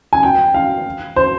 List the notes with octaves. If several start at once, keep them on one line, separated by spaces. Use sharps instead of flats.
G#5
G5
F5
C5